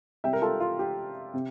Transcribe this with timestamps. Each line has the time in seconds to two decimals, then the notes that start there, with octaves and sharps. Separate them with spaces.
0.24 C3 G3 E5 G5
0.33 A#4
0.42 F4 A4
0.60 F4
0.79 G4
1.34 C3